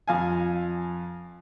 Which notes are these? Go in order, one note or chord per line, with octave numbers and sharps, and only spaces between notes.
F2 F5 G#5